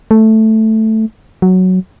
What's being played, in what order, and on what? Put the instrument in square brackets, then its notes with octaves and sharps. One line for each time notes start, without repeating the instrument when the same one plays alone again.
[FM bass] A3
F#3